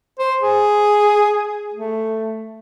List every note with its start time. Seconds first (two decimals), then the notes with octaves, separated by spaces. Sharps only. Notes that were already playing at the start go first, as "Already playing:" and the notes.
0.19 C5
0.41 G#4
1.74 A3